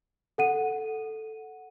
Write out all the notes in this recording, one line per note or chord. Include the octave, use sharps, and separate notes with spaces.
A4 F#5 D#7